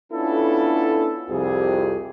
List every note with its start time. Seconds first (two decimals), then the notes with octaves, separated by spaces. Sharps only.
0.13 B3 C#4 D4 E4 F4 A4
1.29 C2 F2 G4 G#4